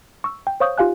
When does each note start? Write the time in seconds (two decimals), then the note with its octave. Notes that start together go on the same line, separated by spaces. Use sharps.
0.24 C#6 E6
0.47 G5
0.60 C5 C#5 F5 C#6 D#6 G6
0.78 D#4 F4 G4 F5 G#5 F#6